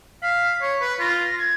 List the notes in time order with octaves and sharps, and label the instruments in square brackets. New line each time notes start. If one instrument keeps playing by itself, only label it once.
[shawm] F5 [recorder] B6
[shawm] C#5
B4
[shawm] F4 [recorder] A#6
[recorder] G#6